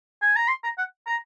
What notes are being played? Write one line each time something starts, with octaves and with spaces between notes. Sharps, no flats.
G#5
A#5
C6
A#5
F#5
A#5